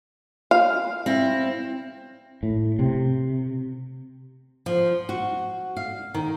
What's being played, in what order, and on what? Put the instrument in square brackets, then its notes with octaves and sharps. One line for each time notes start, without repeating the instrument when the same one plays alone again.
[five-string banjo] F5
[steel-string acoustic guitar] C4 E4
[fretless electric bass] A2
C3
[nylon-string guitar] F3
F#4
F5
D#3